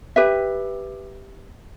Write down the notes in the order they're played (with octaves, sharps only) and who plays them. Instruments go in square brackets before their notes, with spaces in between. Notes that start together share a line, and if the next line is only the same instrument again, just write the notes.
[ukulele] G4 B4 E5